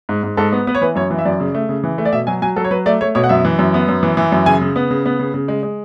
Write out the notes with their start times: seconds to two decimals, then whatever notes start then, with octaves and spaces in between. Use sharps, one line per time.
0.09 G#2
0.24 G#2
0.37 G#2 A4
0.52 B3
0.67 B3 B4
0.75 C#5
0.81 E3 B4
0.95 F#2 C#5
1.10 E3
1.19 E5
1.25 F#2 D5
1.40 C#3
1.55 A3
1.69 C#3
1.84 E3
1.98 A3
2.05 D5
2.13 B2 E5
2.27 F#3 G#5
2.42 F#3 G#5
2.56 F#3 A4
2.64 C#5
2.71 F#3 B4
2.86 A3 D5
3.01 A3 C#5
3.15 B2 C#5
3.24 F#5
3.29 F#2 E5
3.45 E3
3.59 F#2
3.74 B3
3.88 F#2
4.03 E3
4.17 E3
4.32 F#2
4.46 C#3 G#5
4.61 C#3
4.76 B3
4.90 C#3
5.06 B3
5.20 C#3
5.34 C#3
5.48 G#3
5.63 G#3